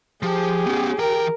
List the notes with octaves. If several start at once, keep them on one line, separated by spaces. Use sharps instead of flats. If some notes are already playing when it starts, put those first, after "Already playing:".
F3 G4 G#4
B3 C#4
E3 A#4 G5